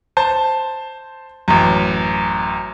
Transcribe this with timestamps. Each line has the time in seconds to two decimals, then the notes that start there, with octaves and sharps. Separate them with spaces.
0.17 C5 A5
1.48 A1 F#2